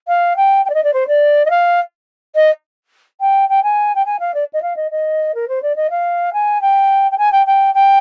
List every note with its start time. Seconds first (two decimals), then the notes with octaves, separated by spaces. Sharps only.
0.07 F5
0.36 G5
0.65 G5
0.69 D5
0.74 D#5
0.83 D5
0.93 C5
1.07 D5
1.45 D#5
1.50 F5
2.35 D#5
3.20 G5
3.49 G5
3.63 G#5
3.95 G5
4.05 G#5
4.19 F5
4.34 D5
4.53 D#5
4.62 F5
4.76 D#5
4.91 D#5
5.34 A#4
5.48 C5
5.62 D5
5.76 D#5
5.90 F5
6.33 G#5
6.61 G5
7.11 G5
7.18 G#5
7.32 G5
7.46 G5
7.74 G5